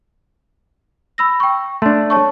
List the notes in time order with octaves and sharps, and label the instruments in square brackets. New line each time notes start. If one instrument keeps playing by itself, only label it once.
[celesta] B5 E6 A#6
G5 C#6
[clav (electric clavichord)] A3 D4 [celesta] C6
[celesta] C#5 A5 C#6